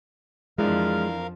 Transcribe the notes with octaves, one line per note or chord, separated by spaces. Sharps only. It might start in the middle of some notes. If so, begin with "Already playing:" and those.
F2 E3 F3 G#3 D4 A#4 F5